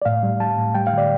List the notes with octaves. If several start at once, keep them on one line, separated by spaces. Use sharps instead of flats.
D5
A2 F5
G3
G3 A5
A2
G3 G5
F5
D3 D5